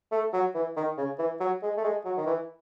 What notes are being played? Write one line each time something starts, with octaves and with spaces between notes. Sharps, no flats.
A3
F#3
E3
D#3
C#3
E3
F#3
G#3
A3
G#3
F#3
D#3
E3